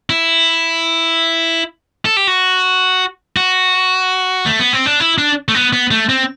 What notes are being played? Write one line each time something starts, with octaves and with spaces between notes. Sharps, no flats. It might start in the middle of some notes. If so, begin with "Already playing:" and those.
E4
A4
G4
F#4
F#4
A3
B3
C4
D4
E4
D4
A3
B3
B3
A3
C4